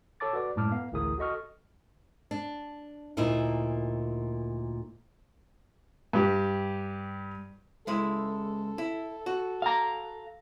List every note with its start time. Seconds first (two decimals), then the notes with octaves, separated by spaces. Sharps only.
0.20 A4 C#5 A5 D6 A6
0.33 F#4 B4 D5 D6
0.56 F#2 A2 G#3 A5 D6 F6
0.71 B3 F5
0.92 A1 D2 E4 G#4 A#4 D#6
1.18 F#4 A4 D#5 C#6 F6
2.31 D4
3.17 D2 A#2 A#3 D#4 E4
6.13 G2 G4
7.87 C#2 G#3 E4 A4
8.78 E4
9.26 F#4
9.62 F5 A#5